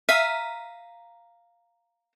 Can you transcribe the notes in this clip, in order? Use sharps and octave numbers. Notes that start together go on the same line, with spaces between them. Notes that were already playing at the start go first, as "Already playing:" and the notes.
E5 F5 A#5 B6 D#7